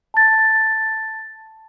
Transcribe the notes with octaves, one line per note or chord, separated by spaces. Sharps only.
A5 A6